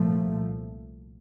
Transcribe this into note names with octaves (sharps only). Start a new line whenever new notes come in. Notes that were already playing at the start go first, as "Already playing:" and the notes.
Already playing: C2 A#2 F3 A3